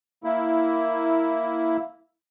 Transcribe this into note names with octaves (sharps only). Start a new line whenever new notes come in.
A#3 E4